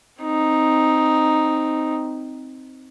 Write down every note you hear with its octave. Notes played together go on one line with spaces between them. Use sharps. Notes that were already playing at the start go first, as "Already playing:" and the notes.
C4 D#4